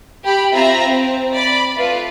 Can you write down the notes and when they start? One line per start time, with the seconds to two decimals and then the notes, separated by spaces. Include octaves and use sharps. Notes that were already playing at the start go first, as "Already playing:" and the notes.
0.24 G4 B5
0.54 C4 F4 E5 A#5 B5
0.88 C4
1.34 D5 B5
1.76 A3 F4 B4